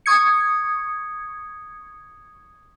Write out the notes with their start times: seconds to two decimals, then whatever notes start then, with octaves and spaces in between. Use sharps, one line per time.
0.06 C#6 D#6 G#6 C#7